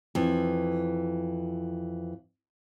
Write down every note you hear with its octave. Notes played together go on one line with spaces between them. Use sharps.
F2 E3